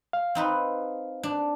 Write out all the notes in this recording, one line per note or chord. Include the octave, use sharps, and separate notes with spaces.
F5
C4 D#4 B4
D4